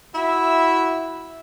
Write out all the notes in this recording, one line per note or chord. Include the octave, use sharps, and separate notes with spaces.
E4 F#4 E5